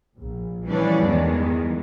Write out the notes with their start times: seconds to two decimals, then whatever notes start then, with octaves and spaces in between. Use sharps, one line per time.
0.18 A#1
0.65 E3 F3 G3 C#4 D4 D5
1.02 E2 G2 D#3 E3 G#3